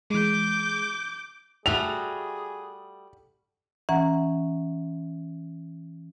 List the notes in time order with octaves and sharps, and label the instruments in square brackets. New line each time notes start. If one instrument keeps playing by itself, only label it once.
[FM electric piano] E3 G#3 [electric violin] D6 G6
[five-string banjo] G3 A3 F#4 [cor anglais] G#4 [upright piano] F7
[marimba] E3 C#4 F#5 A#5